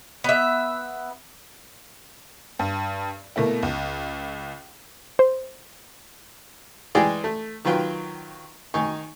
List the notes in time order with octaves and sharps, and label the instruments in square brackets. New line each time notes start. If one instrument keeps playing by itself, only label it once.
[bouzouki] B3 E5
[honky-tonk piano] G2
B2 A3 A#3 E4
C#2
[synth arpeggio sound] C5
[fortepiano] E3 G#3 G#4 D5 G5 G#5
A3
D#3 F#3 F4 B4 G5
D#3 D#4 G#5 C#6